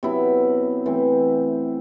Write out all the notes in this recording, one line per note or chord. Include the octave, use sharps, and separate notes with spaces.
C3 F#3 B3 E4
E3 A3 C4